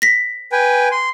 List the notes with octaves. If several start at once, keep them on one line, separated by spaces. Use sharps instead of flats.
A#6 B6
B4 G5 G#5
C6